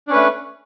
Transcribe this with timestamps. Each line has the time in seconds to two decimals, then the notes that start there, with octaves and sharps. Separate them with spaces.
0.07 D4
0.10 C#4
0.13 B4
0.15 A3